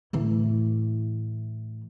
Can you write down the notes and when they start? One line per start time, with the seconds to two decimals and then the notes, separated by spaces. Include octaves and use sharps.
0.13 A2 E3